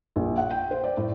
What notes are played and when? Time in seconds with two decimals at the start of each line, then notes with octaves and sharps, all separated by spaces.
0.16 A#1
0.38 F#5
0.51 G5
0.71 C5
0.84 D5
0.97 A2